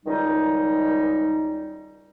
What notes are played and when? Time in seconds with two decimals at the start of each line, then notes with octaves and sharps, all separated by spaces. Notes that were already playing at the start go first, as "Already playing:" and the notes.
0.06 C#2 D#3 G3 D#4